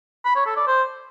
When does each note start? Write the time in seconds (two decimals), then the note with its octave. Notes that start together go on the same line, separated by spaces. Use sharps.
0.25 B5
0.36 C#5
0.46 A4
0.57 D5
0.67 C5